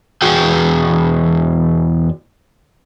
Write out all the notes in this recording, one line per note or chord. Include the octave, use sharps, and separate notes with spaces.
E2 F#4 G#4 G5